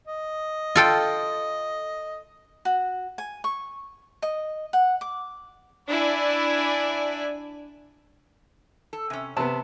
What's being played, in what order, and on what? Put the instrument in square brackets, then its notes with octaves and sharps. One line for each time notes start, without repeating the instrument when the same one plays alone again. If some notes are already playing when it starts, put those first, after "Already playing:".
[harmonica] D#5
[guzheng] F4 A4 G5
[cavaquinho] F#4
G#5
C#6
D#5
F#5
D6
[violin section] D4 E4 D5 G#5
[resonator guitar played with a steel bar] A4
C3 C#4
[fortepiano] C3 B3 [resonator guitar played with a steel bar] A5